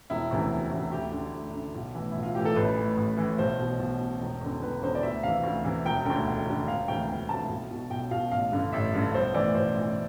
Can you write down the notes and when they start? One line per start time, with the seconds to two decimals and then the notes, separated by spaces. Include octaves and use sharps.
0.10 E1 E4
0.31 D2 C3 E3
0.50 E1
0.71 D2 C3 E3
0.91 D2 G4
1.12 D3
1.33 D2
1.53 D3
1.75 B1
1.95 A2 E3
2.12 B1 E4
2.23 F4
2.35 A2 E3 G4
2.45 A4
2.56 A1 B4
2.76 A2 E3
2.97 A1
3.17 A2 E3
3.38 B1 C5
3.59 B2
3.80 B1
4.01 B2
4.21 E1
4.41 E2 D3
4.62 E1 B4
4.82 E2 D3 C5
4.95 D5
5.03 D2 E5
5.23 C3 E3 F5
5.44 D2
5.64 C3 E3
5.85 E1 G5
6.05 D2 D3 G5
6.27 E1
6.46 D2 D3
6.68 E1 F5
6.88 D2 C3 E3 G5
7.08 E1 G5
7.28 D2 C3 E3 A5
7.49 B1
7.70 B2
7.90 B1 G5
8.11 B2 F5
8.31 A1 F5
8.52 G2 D3
8.72 A1 E5
8.94 G2 D3
9.14 B1 C5
9.34 A2 E3 D5
9.54 B1 C5
9.76 A2 E3